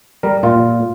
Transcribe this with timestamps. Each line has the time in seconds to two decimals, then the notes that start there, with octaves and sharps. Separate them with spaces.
0.23 G3 A#4
0.43 A#2 F4